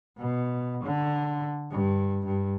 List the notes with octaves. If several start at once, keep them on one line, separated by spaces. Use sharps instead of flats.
B2
D3
G2
G2